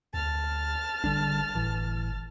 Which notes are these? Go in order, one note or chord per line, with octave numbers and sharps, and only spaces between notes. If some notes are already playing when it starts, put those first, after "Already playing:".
D2 A5 F6
G#1 D3 G3 D4
G1 A2 E3